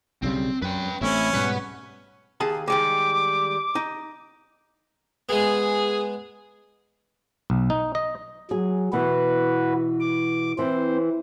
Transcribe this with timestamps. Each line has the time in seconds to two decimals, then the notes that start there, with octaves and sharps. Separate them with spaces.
0.23 B1 C#3 G3 C4
0.62 F#2 B4 G5
1.01 A1 A3 C4 C#4 E4
1.33 G#2 B2 G3 B4 F#5
2.40 D#2 G#4 A5
2.68 D#3 G3 G#3 D6
3.75 D#4
5.29 G#3 B3 G#4
7.50 B1
7.70 D#4
7.95 D#5
8.51 F#3 G#4
8.93 B2 E3 F#4 B4
10.00 D6
10.59 E3 C4 C5